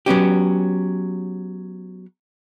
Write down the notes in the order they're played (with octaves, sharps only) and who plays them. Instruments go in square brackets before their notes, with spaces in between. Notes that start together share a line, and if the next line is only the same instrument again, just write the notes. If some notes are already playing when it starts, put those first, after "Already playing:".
[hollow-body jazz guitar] F#3 B3 C#4 G4